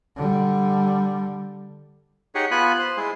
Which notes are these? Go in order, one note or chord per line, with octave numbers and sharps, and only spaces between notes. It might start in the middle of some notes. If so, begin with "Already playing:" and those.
D3 G3
D#4 G4 G#4 C#5 F#5
B3 F4 G#5 B5 F#6
C5
G#3 E4 G#4